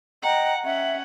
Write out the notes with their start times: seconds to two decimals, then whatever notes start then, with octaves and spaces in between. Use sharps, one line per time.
0.23 D#5 F#5 G5 A#5
0.65 C#4 E5 F#5